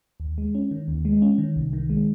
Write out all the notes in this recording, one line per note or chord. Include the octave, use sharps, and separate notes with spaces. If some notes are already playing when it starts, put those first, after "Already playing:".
D#2
G#3
C#4
D#3
D#2
G#3
C#4
D#3
C2
D#3
G#3